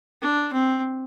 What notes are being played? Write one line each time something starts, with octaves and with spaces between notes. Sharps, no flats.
D4
C4